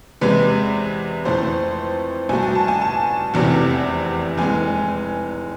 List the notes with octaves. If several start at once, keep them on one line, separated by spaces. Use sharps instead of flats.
E2 C3 G#3 B4
F2 E3 A3 C5
C2 B2 A3 G#5
G#5
A5
G#5
A5
F1 E2 C3 E3
F1 E3 G#3 G#5